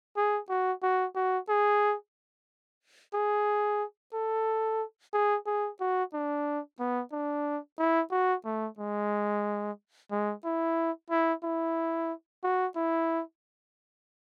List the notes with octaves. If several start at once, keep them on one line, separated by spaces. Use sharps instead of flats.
G#4
F#4
F#4
F#4
G#4
G#4
A4
G#4
G#4
F#4
D4
B3
D4
E4
F#4
A3
G#3
G#3
E4
E4
E4
F#4
E4